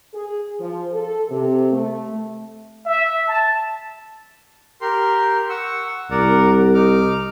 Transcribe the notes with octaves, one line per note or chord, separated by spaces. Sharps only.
G#4
F3
A4
C3
A3
E5
A5
G4 A#4 C6
F#5 C#6 E6
C2 A#4 D5 F#5
D#4 D6 F6